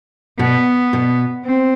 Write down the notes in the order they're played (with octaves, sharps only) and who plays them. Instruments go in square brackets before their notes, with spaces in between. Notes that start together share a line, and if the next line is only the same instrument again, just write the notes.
[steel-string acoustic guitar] B2 [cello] B3
[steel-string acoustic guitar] B2
[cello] C4